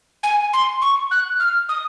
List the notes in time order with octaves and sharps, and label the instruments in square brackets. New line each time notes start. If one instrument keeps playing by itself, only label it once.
[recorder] G#5
C6
C#6
F#6
F6
D#6